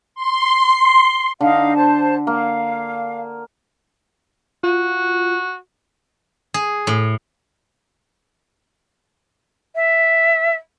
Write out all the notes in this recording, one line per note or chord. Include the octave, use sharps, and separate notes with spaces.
C6
D3 D#4 F5
C5 A5
A#3 F5
F4 F#4
G#4
A2
E5